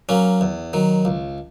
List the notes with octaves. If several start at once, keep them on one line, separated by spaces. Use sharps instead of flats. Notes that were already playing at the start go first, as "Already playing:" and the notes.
F#3 A#3 C#4
E2
D#3 F#3
C#2